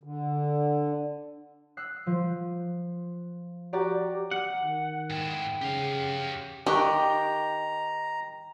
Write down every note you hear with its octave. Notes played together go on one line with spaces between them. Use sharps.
D3
E6 F#6 C7
F3
F#4 G4 D5 A#5
F#5
D#3
G#2 E4 G5
C#3 G4 F5
D#3 G4 G5 A#5 C#6 F#6